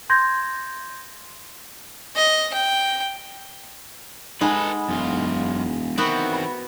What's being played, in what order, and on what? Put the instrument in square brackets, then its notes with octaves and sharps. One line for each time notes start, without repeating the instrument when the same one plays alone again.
[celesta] C6 G6 G#6 A#6
[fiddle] D#5
G5
[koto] G#3 [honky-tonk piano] D#4 F#5 B5 [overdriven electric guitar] A4 B4
[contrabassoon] E1 [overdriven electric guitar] F#2 F4
[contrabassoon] D#3 [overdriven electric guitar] E3 C4 [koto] B3 F#4
[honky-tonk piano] B5